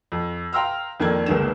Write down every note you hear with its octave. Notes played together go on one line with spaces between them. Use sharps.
F2
F5 G5 A#5 C6 E6 F6
F2 D#3 A#3 D4 A4 G#6
G1 C#2 D#3 A#3 E7